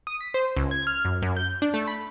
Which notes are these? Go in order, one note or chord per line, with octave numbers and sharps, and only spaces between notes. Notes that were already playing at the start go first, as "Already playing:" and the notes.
D#6
B6
C5
C#2
G#6
F6
F#2
F#2
G6
D4
A3
B5